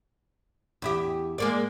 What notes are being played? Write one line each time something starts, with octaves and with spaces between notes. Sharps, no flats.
E2 E4 G4
G#3 A#3 D5